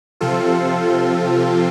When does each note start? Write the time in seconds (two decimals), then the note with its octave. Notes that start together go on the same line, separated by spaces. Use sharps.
0.21 C3 F3 C4 F4 A4